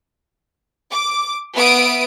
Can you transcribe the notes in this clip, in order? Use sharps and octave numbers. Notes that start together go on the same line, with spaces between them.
D6
B3 E5 D#6 D7